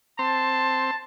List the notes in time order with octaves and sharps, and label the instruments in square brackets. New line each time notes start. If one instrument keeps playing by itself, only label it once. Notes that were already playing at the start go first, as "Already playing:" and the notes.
[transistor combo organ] C4 C6 [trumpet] A5